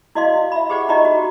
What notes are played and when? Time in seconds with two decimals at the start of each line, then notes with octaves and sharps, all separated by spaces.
0.15 E4 F#4 D5 D#5 F5 C6
0.52 E5 B5
0.70 G4 G#4 C5 D5 F#5
0.89 D#4 F4 G4 D5 D#5 A#5
1.05 F#4